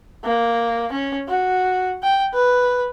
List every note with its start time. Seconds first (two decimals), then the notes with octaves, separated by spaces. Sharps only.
0.24 A#3
0.92 C#4
1.28 F#4
2.03 G5
2.33 B4